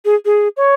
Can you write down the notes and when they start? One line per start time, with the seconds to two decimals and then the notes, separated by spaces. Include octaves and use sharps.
0.05 G#4
0.25 G#4
0.57 C#5